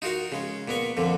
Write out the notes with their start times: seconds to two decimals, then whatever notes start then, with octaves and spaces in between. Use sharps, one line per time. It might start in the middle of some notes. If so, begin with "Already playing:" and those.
0.02 D#4 F4 F#4 A#4 F5
0.32 C#3 G#3
0.68 A#2 B3 A#4 C#6
0.97 F2 A#2 D3